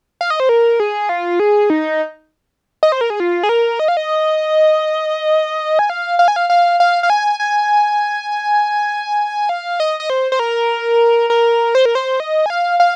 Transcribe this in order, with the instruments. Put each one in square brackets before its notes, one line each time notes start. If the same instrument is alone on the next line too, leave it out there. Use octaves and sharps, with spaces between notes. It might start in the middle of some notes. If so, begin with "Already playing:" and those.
[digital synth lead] F5
D#5
C5
A#4
G#4
F4
G#4
D#4
D#5
C5
A#4
G#4
F4
G#4
A#4
D#5
F5
D#5
G#5
F5
F5
G#5
F5
F5
F5
F5
G#5
G#5
F5
D#5
D#5
C5
C5
A#4
A#4
C5
A#4
C5
D#5
G#5
F5
F5